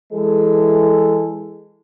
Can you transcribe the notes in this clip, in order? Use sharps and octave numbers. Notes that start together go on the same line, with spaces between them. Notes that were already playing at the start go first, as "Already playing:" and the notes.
E3 G#3 A4